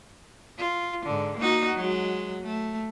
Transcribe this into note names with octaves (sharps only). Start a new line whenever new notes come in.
F4
G#2 D3
A#3 D#4 F#4
F#3 G#3
A3